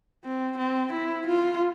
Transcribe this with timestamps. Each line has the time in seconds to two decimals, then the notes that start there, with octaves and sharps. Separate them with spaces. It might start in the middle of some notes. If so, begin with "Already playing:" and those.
0.24 C4
0.57 C4
0.92 E4
1.27 F4